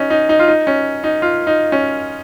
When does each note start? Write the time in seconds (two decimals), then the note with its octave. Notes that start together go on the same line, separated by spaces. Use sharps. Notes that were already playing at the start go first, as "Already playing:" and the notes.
Already playing: C#4 D#4
0.10 D#4
0.29 D#4
0.39 F4
0.48 D#4
0.67 C#4
1.04 D#4
1.22 F4
1.47 D#4
1.72 C#4